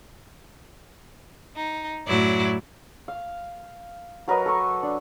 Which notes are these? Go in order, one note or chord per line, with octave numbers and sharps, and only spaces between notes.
D#4
F#2 A2 F#3 E4 D5
F5
F#3 A#4 B4 D#5
A4 C#6
D4